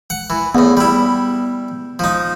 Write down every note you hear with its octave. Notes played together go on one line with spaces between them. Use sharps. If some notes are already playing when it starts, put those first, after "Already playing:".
F#5
E3
E2 A2 B3
G3 E4
F3 D#4